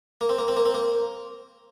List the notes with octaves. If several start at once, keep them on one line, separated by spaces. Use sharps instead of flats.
A#3
C4
A#3
C4
A#3
C4
A#3